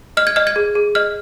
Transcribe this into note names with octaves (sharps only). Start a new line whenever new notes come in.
D#5 F6
G#6
D#5 F6
G#6
G#4
G#4
D#5 F6